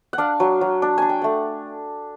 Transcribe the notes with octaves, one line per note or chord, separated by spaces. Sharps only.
F#5
D4 F5
F#3
F#3
D4
D4 G#5
G5
A3 F#5